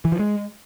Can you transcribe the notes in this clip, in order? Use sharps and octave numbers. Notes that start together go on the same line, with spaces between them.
E3
F3
G#3